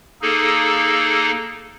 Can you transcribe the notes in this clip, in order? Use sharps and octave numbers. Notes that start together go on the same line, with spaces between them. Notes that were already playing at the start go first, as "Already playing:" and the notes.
A#3 D#4 G#4 A4